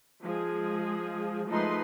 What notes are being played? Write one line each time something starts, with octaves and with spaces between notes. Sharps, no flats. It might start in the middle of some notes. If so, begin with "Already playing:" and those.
F3 G#3 G#4
F3 G#3 A3 D#4 B4 C6